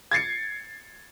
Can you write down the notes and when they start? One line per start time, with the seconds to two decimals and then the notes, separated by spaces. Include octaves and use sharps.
0.11 G#6 A6 C7 C#7